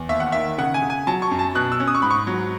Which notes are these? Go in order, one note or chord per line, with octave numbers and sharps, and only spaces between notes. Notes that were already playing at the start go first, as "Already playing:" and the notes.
Already playing: E2
D#2 E5
F#5
D#3 E5
C#3 F#5
G#5
C#3
G#5
F#3 A5
C#6
F#2
A5
B2 F#6
E6
C#4
D#6
C#6
G#2 B5
C#6
F#3